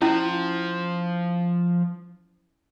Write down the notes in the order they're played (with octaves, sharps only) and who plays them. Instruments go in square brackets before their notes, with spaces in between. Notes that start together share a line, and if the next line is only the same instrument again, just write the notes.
[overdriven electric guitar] F3 [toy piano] C#4 E4